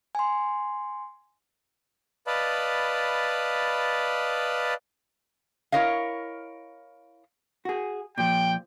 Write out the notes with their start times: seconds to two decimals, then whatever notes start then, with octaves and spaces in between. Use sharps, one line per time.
0.15 G#5 C6
2.27 B4 D5 D#5 F5 A5 B5
5.72 E4 A#4 C#5 D#5 F5
7.65 F#4 G#4
8.18 A#2 F3 G5